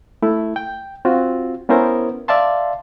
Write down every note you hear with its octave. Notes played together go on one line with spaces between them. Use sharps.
A3 E4
G5
C4 F4 F#4
B3 C#4 E4 A#4 C5
D5 E5 F5 A5 C6